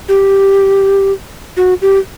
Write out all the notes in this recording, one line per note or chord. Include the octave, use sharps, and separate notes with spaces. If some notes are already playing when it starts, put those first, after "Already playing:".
G4
F#4
G4